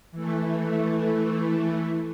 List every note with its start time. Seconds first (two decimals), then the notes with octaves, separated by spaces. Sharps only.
0.11 E3 A3